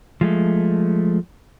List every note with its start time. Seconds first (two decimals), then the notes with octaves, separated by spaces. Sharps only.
0.21 F3 G#3 A3